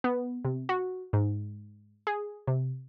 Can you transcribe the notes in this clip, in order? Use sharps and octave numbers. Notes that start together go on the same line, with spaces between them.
B3
C3
F#4
G#2
G#4
C3